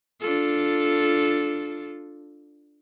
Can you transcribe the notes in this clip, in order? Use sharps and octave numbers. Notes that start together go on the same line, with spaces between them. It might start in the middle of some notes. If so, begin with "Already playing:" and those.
D4 F4 A4